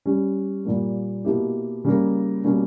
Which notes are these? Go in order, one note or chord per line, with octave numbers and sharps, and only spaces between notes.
G3 C#4 G4
A#2 G3 A#3
B2 A#3 E4 G4
C#3 G3 A#3
B2 G3 A#3 C#4